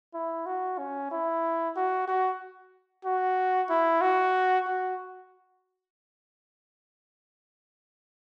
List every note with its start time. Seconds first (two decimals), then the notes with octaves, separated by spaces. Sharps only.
0.14 E4
0.46 F#4
0.78 C#4
1.11 E4
1.76 F#4
2.08 F#4
3.05 F#4
3.69 E4
4.01 F#4
4.67 F#4